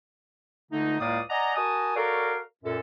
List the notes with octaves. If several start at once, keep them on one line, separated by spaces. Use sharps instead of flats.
C#2 D3 A3 D#4
C#2 A2 A#3 D5 F5 D#6
D5 D#5 F#5 G#5 A#5
F#4 A#4 G#5 A5 D#6
F#4 A4 A#4 C#5 D5 F5
F#2 A#2 A4